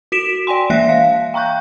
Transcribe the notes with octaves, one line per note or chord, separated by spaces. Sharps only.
F#4 B6 D7 E7
D5 G5 G#5 C6
E3 A#3 E5 F#6 A#6 B6
F5
G5 A#5 C#6 F#6 G6